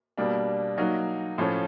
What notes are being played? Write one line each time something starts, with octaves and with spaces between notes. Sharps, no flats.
B2 G3 A#3 D4
F#3 A#3 D#4 F#4
A2 F3 A3 C#4